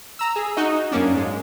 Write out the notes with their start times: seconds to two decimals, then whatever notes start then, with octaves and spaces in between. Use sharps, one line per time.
0.19 A#5 E6
0.36 G#4
0.57 D#4 F#4 D#5
0.91 F#2 A#3 C#4 D4
1.15 G#2 G#3